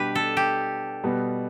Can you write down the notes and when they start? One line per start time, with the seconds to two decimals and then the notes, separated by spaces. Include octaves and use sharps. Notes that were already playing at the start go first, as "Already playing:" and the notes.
Already playing: B2 G3 D4 G4 B4
0.15 A4
0.37 G4
1.03 B2 G3 B3